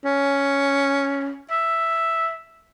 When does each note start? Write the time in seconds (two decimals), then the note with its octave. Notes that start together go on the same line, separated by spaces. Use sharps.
0.05 C#4
1.51 E5